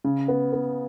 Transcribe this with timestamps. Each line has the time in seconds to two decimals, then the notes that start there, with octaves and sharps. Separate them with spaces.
0.04 C#3
0.28 B3
0.53 B3